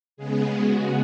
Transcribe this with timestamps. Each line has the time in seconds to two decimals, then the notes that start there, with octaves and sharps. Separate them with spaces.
0.17 C#3 G#3 B3 G#4
0.56 F#4